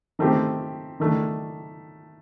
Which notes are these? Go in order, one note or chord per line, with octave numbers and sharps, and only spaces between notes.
D#3 A3 C4 G4
D#3 A3 D4